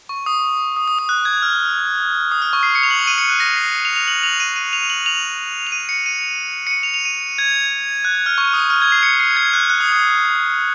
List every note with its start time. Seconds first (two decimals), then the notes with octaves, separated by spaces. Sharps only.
0.09 C#6
0.26 D#6
0.77 D#6
0.88 D#6
0.99 D#6
1.09 F#6
1.25 G#6
1.42 F6
2.31 D#6
2.42 F6
2.53 C#6
2.63 C7
2.75 C#7
2.83 F7
2.90 F#7
2.99 F7
3.07 D#7
3.18 C#7
3.29 F#6
3.40 A#6
3.57 C7
3.85 F7
3.96 F7
4.08 F#7
4.23 F7
4.40 D#7
4.56 D#7
4.73 F7
4.90 F#7
5.06 F7
5.67 F7
5.72 D#7
5.89 C#7
6.06 D#7
6.67 C#7
6.71 D#7
6.83 F7
6.94 F7
7.05 D#7
7.38 G#6
8.05 F#6
8.15 F#6
8.26 F6
8.38 C#6
8.53 D#6
8.70 F6
8.82 G#6
8.92 C7
9.03 C#7
9.20 C7
9.37 G#6
9.53 F#6
9.70 F#6
9.80 D#6
9.92 D#6